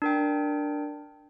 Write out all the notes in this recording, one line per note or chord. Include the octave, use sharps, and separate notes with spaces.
D4 A#4 G5